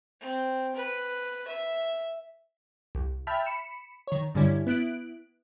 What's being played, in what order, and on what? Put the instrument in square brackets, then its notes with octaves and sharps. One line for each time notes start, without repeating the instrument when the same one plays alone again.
[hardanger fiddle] C4
B4
E5
[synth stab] C2
E5 G5 A5 B5 F6
B5 C#7 E7
D#3 C#5
G2 D3 G3 C#4 E4
B3 E4 F#6 D7